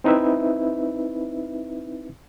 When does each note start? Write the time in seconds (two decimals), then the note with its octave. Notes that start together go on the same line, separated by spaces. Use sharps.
0.04 C4 D#4 E4 B4 E5